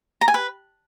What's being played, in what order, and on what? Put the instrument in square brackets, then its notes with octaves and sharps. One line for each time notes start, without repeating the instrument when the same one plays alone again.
[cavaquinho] A#5
G#5
B4